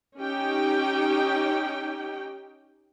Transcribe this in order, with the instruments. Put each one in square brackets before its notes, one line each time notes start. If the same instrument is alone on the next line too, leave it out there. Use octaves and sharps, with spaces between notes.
[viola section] C#4 D#4 G4 G5